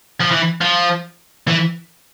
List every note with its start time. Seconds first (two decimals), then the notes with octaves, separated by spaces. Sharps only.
0.20 F3
0.31 E3
0.61 F3
1.48 E3